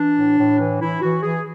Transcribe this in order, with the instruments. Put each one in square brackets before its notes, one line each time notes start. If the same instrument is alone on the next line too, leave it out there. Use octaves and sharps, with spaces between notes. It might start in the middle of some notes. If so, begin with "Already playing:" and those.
Already playing: [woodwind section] E3 D4
A2
A2
E3
E3 E4
E3 F#4
E3 G#4